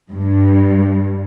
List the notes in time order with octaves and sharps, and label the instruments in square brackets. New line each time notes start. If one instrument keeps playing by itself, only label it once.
[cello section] G2